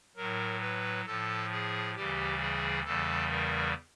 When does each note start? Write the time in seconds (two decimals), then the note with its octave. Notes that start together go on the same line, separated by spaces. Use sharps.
0.16 A2 F#3 A#4
0.61 B4
1.06 A2 F3 A4
1.51 G#4
1.95 D2 C#3 E3 G3 G4
2.40 G#4
2.84 E2 C#3 E3 G3 A4
3.29 A#4